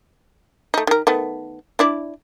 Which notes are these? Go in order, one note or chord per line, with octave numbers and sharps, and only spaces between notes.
A3 D#4
D#3 A#4
D#3 A3 B3
D4 E4 D5